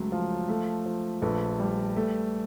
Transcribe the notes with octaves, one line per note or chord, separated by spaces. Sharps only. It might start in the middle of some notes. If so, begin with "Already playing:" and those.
Already playing: C#2 F#3 A3
F3
A3
F3
A#1 A4 B4
G3
A3